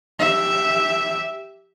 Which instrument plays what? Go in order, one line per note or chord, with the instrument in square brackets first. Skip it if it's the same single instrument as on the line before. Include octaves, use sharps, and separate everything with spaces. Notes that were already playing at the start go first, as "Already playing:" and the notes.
[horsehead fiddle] G4 E5